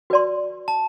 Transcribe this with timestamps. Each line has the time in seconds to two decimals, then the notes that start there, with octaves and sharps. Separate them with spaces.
0.10 F#4 B4 D5 A5 C6
0.68 A5